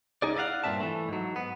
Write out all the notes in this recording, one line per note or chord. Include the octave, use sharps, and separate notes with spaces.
C#2 D#4 G#4 D5
E4 D5 D#5 F5 F#5
G2 A#2 F3 C4 E5 A5
E3 A3
G#2 F#3
B3